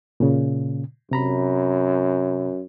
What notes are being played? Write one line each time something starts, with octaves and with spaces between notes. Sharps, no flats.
A#2 C#3
F#2 C3 A#5 B5